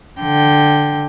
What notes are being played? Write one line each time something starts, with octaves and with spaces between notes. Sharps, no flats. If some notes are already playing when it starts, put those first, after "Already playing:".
D3 G5